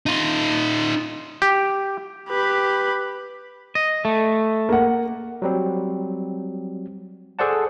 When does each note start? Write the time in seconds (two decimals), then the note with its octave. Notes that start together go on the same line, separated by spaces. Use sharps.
0.06 D#4 F4
1.42 G4
2.29 G4 B4
3.75 D#5
4.05 A3
4.69 A#3 F#5
5.42 F#3 G3 C4
7.39 G#4 A4 C5 D5 F#5 A5